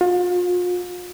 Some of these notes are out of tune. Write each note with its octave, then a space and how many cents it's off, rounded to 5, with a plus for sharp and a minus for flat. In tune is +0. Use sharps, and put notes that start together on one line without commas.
F4 +40